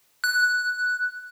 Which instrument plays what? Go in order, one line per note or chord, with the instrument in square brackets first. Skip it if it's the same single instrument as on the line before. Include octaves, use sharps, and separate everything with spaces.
[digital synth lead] F#6